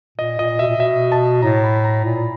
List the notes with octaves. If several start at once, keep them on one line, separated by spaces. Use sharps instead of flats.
A#2 D#5
A#2 D#5
B2 E5
A#2
B2 E5
A5
A2 A#5
B5
A#5
A#2